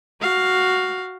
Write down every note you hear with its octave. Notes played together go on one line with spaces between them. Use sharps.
F#4 F5